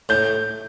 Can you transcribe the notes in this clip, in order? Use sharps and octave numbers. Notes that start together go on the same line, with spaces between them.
A2 G6